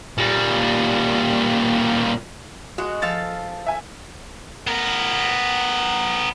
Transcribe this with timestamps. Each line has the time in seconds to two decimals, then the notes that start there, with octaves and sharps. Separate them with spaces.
0.18 A#2 G3
2.78 G#3 F#4
3.02 F3 A4 F5 A6
3.66 E5 G#5
4.67 B3 A#4